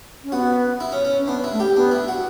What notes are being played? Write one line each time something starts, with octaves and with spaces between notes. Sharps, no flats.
C#4
B3 F#4
E4
C#4
C#4
C#4
B3 D4
E4
A3
G4
B3 D4
E4
F#4